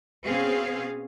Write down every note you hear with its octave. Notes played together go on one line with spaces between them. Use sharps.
B2 C4 C#4 G#4 F5